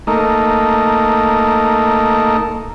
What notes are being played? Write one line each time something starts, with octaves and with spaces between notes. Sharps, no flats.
A3 A#3 D#4